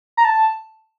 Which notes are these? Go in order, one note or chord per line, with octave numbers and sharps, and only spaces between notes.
A#5
A5